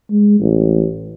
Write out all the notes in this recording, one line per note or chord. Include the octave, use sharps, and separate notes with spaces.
G#3
A1